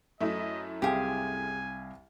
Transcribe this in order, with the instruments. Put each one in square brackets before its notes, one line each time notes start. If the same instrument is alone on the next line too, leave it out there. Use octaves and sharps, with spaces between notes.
[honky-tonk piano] F#2 A3 E4 [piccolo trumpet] D#5
[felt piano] C2 C4 F5 [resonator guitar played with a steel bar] G4 G#4 [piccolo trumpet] G#5